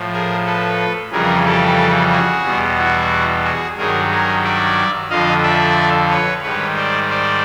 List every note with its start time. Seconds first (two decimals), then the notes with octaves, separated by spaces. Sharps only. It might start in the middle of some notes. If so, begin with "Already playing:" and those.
Already playing: A2 F3
0.13 G#4 A#4
0.45 A4 B4
1.12 F2 C#3 E3 G3 G#4 A#4
1.45 G4 A4
2.11 F#4 G#4
2.45 E2 B2 G3
2.78 E4 F#4
3.44 F#4 G#4
3.77 G2 D#3 F#3 G#4 A#4
4.11 G#4 A#4
4.44 D5 E5
5.10 F2 D3 F3 D#5 F5
5.43 D5 E5
6.10 B4 C#5
6.43 G#2 D#3 G3 B4 C#5
6.76 C5 D5
7.10 C5 D5